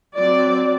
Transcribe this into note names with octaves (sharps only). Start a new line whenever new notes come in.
F#3 C4 D5